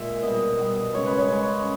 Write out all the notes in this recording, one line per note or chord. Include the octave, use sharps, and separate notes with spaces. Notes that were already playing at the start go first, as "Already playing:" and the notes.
Already playing: A#2 G#3 E5
B2 G3 D#5
B2 G3
C#3 G#3 C#5
B4
C#5
C#3 G#3